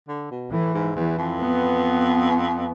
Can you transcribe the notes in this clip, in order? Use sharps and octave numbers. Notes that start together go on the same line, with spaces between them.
D3
B2
A2 E3
G#2
E2 E3
F2
B3